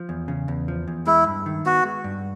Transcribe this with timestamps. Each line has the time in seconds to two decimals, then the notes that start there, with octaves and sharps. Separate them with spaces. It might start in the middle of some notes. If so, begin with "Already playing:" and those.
Already playing: F3
0.09 E2
0.28 C#3
0.48 E2
0.68 F3
0.88 E2
1.07 G#3 E4
1.27 G2
1.46 D#3
1.66 B3 F#4
1.85 G#3
2.04 G2